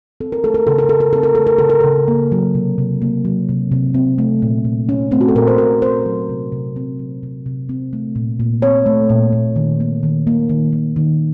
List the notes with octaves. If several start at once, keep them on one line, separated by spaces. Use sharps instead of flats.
C4 A4
A#4
A3 A4
A#4
C#3 A4
A#4
C#3 A4
A#4
C4 A4
A#4
A3 A4
A#4
C#3 A4
A#4
C#3 A4
A#3
F#3
C3
C3
A#3
F#3
C3
C3
C4
A3
A#2
A#2
C4 C#4
A3 C4
F#4
A4
A#2 A#4
C5
A#2 A#4
C4 C5
F#3
C3
C3
C4
F#3
C3
C3
C4
A3
A#2
A#2
C4 C#5
A3
A#2
A#2
D#3
A#3
D#3
A#3
D#3
A#3
D#3